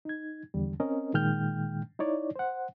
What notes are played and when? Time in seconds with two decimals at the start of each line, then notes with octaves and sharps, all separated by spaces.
0.05 D#4 G#6
0.54 E2 D3 G3
0.80 C4 C#4 A#4 D#5
1.14 A#2 D#3 G#3 G5 F6 G6
1.99 D#4 E4 C#5 D5
2.36 C5 F#5